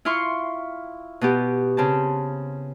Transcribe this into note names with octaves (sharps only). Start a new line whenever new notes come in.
E4 F4 F5 C6 C#6
B2 B3 G4
C#3 C4 A5